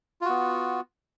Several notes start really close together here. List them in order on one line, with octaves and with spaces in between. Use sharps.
F4 F#4 B3